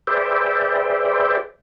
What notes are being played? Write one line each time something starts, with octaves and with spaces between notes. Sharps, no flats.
G#4 B4 C5 D5 E5 G5